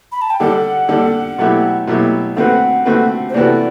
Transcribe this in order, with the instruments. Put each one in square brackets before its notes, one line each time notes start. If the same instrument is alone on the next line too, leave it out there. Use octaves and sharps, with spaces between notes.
[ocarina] B5
A5
G5
[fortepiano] D3 G3 D4 A4 [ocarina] F#5
[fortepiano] D3 G3 D4 A4
B2 F#3 A3 E4 G4
B2 F#3 A3 E4 G4
[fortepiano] D3 A3 C4 F#4 B4 [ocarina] F#5
[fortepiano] D3 A3 C4 F#4 B4
[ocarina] C5
[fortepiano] C3 E3 B3 F#4 A4 [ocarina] D5